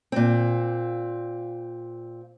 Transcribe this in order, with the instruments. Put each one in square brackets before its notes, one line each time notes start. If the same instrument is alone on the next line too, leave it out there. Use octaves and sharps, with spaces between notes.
[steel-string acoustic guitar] A#2 C4